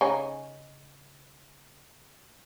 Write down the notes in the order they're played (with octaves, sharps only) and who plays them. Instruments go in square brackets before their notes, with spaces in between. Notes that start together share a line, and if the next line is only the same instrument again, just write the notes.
[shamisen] C#3 C#4 D#4